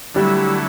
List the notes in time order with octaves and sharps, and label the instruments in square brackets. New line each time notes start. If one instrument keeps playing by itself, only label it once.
[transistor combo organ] D3 F#3 A3 E4 [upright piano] G3